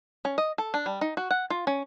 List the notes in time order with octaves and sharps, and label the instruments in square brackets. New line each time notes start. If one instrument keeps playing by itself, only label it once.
[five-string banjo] C#4
D#5
A4
D4
G3
D#4
F#4
F#5
F4
C#4